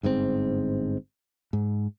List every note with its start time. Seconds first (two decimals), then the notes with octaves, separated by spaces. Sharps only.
0.03 G1 G#2 D3 C4
1.53 G#2